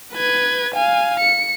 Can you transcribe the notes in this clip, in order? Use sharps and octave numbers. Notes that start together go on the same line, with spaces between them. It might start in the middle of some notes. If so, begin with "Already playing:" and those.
B4 G#6
F5 G#5
C#7